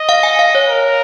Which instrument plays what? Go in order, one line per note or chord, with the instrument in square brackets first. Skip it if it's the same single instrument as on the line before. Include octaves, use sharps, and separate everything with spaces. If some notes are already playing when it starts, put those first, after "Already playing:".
Already playing: [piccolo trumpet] D#5
[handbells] F5
G#5
F5
C#5
[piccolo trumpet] A#4